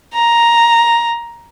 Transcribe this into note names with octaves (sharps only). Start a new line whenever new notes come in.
A#5